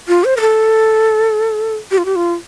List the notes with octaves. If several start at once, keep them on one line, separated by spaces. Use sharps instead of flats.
F4
C5
A#4
A4
G4
F4
G4
F4